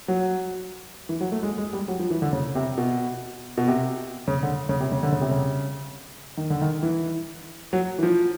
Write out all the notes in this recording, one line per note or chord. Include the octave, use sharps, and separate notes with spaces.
F#3
E3
F#3
A3
G#3
G#3
G3
F#3
F3
E3
D3
C#3
C3
B2
B2
C3
C#3
D3
C#3
C3
C#3
D3
C#3
C3
C#3
D#3
D3
D#3
E3
F#3
E3
F3